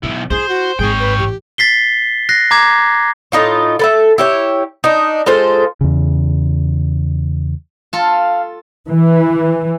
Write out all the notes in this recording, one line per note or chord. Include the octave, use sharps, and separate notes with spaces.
B1 D3 E4
E4 F4 G#4 C5
F#4
G#1 G#2 G#4 C#5 G5
B4
A1 G4
A6 B6 C7 G7
F#6 A#6 C7
A#5 D6 G#6
A2 D#4 F4 C#5
A4 B4 E5
E4 G4 C#5
D4 D#4
G#3 F4 A4 C5
E2 C#3
F4 A4 F5
E3